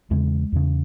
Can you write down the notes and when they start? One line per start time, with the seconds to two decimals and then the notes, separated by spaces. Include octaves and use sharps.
0.11 E2 C#3 G#3
0.52 E2 C#3